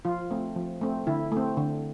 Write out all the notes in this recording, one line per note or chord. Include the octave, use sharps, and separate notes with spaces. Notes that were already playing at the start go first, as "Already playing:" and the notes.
F3 F4
A3 C4
F3
A3 C4
D3 E4
A3 C4
D3